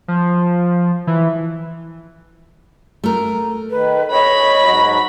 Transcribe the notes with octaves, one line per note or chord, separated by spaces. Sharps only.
F3
E3
A3 A#4
D#3 B4
C#5 D#5 B5
G#2 F#3 F#4